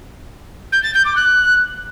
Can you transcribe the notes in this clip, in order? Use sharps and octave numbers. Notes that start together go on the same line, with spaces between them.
G6
A6
G6
D6
F#6